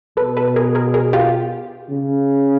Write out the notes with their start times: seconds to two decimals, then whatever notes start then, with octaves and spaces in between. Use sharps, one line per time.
0.17 B2 A4 B4
0.37 A4 B4
0.56 G#4 A#4
0.75 G#4 A#4
0.94 G#4 A#4
1.13 F4 G4
1.90 C#3